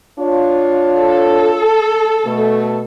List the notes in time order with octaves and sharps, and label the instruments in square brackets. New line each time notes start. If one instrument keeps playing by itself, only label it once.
[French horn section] D4 F4 C#5
[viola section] A4
[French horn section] B2 A3